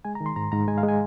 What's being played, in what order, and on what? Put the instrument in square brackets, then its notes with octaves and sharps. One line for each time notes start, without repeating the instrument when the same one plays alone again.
[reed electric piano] G#3 G#5
A#5
D#3
C6
G#2 A#5
G#2 A#5
G#3 G#5
F5
G#3
G#5